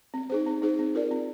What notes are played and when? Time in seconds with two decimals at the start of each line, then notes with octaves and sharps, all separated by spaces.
0.14 C4
0.30 D#4 G#4 C5
0.46 C4
0.62 D#4 G#4 C5
0.79 C4
0.95 F4 A#4 D5
1.11 C4